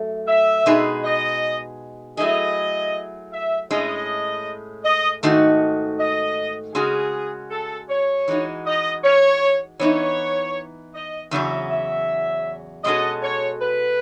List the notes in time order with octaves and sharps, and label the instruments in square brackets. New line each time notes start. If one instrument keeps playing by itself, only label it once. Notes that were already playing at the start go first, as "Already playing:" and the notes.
Already playing: [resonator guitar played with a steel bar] F#2 A3
[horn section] E5
[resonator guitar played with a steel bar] B2 G#3 D#4 G#4 B4
[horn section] D#5
[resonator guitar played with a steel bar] F#3 A3 E4 G#4 [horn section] D#5
[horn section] E5
[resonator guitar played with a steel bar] A2 G#3 C#4 [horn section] D#5
[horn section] D#5
[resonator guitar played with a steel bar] G#2 D#3 A3 D#4 F#4
[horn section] D#5
[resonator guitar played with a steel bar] C#3 G#3 C#4 F#4 [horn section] G#4
[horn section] A4
C#5
[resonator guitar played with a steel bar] E3 G#3 D#4 F#4
[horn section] D#5
C#5
[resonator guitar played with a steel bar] E3 B3 D#4 [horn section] C#5
[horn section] D#5
[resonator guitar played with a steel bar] E2 C#3 F#3 C#4 [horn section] E5
[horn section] E5
[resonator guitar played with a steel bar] B2 G#3 C#4 F#4 A4 [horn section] D#5
[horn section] C#5
B4